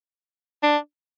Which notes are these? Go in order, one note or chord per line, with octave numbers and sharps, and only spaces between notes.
D4